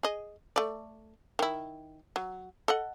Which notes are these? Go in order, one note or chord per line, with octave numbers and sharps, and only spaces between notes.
G#4 D#5
A3 D5
D#3 E4
F#3
A4 D#5 F#5